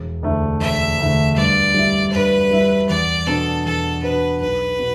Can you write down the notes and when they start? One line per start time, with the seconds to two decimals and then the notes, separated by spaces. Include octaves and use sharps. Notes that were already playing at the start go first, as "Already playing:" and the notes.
Already playing: E1
0.23 D2 D3 A3 E4
0.60 E1 E5
0.99 D2 D3 A3 E4
1.36 G2 D5
1.74 G3 E4
2.12 G2 B4
2.51 G3 E4
2.89 E2 D5
3.27 B2 B3 D4 A4
3.65 E2 A4
4.03 B2 B3 D4 B4
4.41 B1 B4
4.79 B2